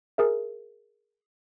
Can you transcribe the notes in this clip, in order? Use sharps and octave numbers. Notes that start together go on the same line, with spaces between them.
G#4 A#4 E5